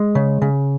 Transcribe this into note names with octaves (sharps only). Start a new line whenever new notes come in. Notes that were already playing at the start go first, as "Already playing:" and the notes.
Already playing: G#3
C#3
C#3